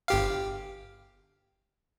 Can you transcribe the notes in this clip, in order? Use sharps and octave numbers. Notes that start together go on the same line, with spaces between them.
G1 G4 F5